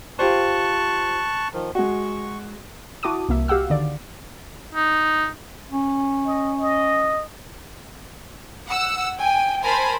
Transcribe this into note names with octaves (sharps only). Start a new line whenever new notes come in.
F4 G4 C5 A5 C#6 F#6
D#3 F3
G#3 F#4 C#6
E4 F#4 A5 D6 D#6 D#7
C2 A#3 E5
F#4 G4 F5 F#5 E6
D3 D#3 D5
D#4
C#4
D#5
D#5
F#5 E6
G5 G#5
A#4 C5 G#5 A5 B5